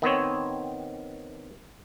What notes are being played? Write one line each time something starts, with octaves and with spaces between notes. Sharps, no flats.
D#3 B3 C4 C#5